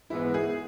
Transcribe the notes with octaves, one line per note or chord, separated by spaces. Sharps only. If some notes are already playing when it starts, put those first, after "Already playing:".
G#2 E3 G#3 B3 E4
G#4